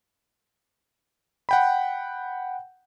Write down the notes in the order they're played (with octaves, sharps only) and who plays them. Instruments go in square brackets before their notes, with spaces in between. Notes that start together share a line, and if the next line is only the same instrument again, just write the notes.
[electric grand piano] F#5 G5 B5